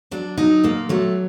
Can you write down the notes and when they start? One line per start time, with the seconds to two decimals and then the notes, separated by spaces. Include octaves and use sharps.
0.11 F#3 D4
0.37 F#3 D#4
0.64 A#2 A#3
0.89 F#3 A3